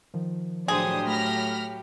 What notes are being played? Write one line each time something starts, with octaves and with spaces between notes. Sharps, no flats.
D#3 F3
A2 F#3 D4 G4 G#4 C5 D#6
A3 B5 F6 A#6